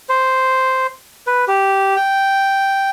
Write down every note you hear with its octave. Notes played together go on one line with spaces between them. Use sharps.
C5
B4
G4
G5